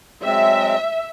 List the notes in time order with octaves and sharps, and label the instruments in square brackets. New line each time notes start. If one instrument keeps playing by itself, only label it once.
[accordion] F#3 G#3 C4 [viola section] E5